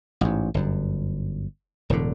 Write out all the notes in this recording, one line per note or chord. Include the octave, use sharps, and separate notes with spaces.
A1 G#2
G1 F#2
E1 A2 D3